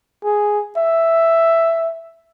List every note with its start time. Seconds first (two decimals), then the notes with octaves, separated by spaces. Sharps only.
0.24 G#4
0.77 E5